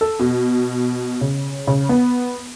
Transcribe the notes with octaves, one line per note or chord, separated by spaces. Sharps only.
A4
B2
C#3
C#3
B3